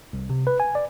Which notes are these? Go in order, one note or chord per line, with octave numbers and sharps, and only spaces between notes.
C2
C3
B4
G#5
D5